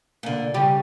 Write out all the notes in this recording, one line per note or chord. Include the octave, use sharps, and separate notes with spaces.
A#2 D3
C#3 G3 G4